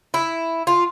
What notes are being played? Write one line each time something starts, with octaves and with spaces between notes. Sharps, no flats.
E4
F4